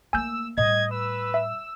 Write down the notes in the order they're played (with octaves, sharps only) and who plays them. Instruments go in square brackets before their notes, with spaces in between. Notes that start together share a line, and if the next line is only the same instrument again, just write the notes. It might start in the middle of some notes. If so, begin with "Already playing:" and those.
[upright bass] A3 A#3 [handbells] G#5 G6 [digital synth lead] E6
[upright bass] A2 G3 [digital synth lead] D#5 [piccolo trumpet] G#6
[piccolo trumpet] B4 [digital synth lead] E6
[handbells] E5